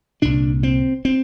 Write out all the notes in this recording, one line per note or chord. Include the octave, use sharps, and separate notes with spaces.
C2 A#2 D4
C4
C4